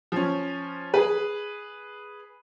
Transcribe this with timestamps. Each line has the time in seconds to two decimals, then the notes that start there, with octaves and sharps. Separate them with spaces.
0.12 F3 C#4
0.94 G#4 B4